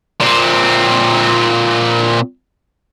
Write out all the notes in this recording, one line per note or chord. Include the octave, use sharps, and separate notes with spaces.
A#2 C4